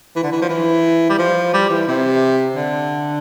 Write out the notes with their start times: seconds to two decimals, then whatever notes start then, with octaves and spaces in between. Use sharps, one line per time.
0.16 E3
0.23 D3
0.32 E3
0.41 F3
0.49 E3
1.09 G3
1.18 F3
1.53 G3
1.69 E3
1.88 C3
2.56 D3